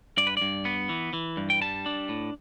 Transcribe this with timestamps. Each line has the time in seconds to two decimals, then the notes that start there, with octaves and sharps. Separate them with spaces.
0.17 G2 D5
0.27 B4
0.37 G2 D5
0.65 B3
0.89 E3
1.13 E3
1.37 G2
1.50 G5
1.61 G3 A5
1.86 D4
2.09 A2